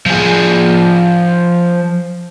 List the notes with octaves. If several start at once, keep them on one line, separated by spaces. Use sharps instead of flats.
F3 G#4